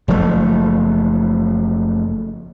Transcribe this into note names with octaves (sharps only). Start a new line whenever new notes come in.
F#1 F3 A3